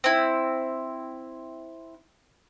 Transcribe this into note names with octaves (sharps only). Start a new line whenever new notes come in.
C4 E4